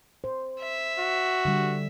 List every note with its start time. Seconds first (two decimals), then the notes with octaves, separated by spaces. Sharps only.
0.24 C5
0.61 E5
0.99 F#4
1.45 D3 G3